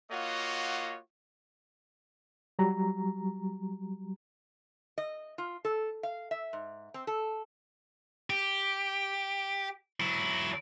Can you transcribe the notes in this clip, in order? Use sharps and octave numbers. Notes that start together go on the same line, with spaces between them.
A#3 F4 F#4 C#5 D#5 F#5
F#3 G3 A#5
D#5
F4
A4
F5
E5
G#2
C4
A4
G4
F#3 E4